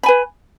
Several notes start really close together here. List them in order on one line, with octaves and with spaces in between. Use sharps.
B5 G#5 B4